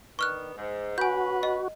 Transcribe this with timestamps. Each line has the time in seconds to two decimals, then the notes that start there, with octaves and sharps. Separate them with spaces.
0.19 D#3 B3 D4 C#6 F6 F#6
0.56 G#2
0.98 C#4 F#4 B4 G#5 G6
1.43 D#5